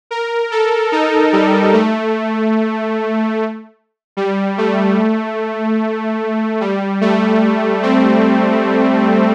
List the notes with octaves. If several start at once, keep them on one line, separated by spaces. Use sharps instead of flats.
A#4
A4
D#4
G3
A3
G3
A3
G3
A3
C4